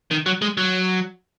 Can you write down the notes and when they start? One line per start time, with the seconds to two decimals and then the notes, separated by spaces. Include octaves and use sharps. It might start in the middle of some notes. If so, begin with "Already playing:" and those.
0.11 D#3
0.26 F#3
0.42 G#3
0.57 F#3